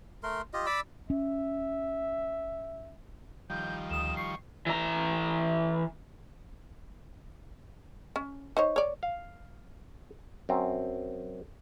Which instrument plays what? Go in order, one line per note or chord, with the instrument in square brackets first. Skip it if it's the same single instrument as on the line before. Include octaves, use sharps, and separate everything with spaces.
[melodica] A3 A#4 C6
F4 G4 D#5
D5 B5 D6 E6
[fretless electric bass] C#4 [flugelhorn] E5
[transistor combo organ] D#3 F3 G3 [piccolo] G6
[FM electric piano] D2 D#6 [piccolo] E7
[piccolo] C#6 [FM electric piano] C7
[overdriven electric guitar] E3 A#5
[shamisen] C#4
D#4 C5 C#5
C#5 D5
[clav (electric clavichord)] F5
F#2 C4